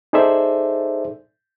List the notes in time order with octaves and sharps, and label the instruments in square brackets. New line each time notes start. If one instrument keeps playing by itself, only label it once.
[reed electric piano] D#4 G#4 A4 C5 D5 E5